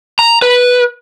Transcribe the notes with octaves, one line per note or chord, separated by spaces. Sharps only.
A#5
B4